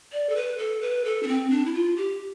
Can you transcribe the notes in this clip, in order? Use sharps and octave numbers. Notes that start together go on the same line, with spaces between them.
D5
A4
B4
A4
B4
A4
D4
C4
D4
E4
F4
G4